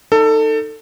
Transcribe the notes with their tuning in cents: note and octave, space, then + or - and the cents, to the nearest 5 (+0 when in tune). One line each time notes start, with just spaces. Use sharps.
D#4 -10 A4 +20